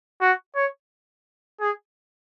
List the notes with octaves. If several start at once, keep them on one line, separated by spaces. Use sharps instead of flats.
F#4
C#5
G#4